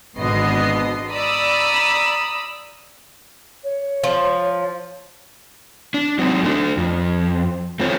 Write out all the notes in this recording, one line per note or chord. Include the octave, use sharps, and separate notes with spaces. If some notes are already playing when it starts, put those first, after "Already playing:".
G#1 B2 D3 B3 D#5 C7
D5 A#5 B5 D#6 E6
C#5
F3
D4
F#3 C4 D#4
A3 D4
F2
A3 C4 F4 C5 C#5